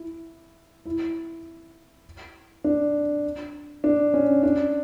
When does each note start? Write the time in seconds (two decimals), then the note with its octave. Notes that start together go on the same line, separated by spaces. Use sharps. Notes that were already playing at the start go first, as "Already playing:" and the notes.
Already playing: E4
0.85 E4
2.64 D4
3.84 D4
4.14 C#4
4.43 D4